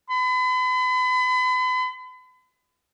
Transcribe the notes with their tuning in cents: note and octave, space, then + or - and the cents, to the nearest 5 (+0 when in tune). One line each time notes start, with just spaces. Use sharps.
B5 +40